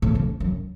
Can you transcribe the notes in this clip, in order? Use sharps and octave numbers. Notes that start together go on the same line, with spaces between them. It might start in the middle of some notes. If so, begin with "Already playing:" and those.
A2
F2
F#2